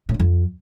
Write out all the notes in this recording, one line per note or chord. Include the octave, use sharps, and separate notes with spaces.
A2
D3
F2